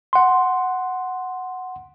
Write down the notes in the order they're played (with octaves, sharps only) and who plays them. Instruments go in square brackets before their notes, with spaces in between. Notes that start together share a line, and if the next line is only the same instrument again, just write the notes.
[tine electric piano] F#5 C6